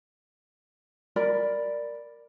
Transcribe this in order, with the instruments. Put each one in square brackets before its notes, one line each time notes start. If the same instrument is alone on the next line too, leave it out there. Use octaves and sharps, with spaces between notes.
[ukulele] A#4 D5 B5